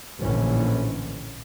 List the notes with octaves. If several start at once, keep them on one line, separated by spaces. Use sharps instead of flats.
A#1 A2 D3 E3 C#4